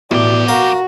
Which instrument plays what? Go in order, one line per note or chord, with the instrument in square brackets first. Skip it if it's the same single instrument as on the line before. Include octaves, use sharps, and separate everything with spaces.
[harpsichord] A1 [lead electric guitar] F2 G4 [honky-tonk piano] B2 [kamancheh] D5
[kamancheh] F#4 [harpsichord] A#4 F5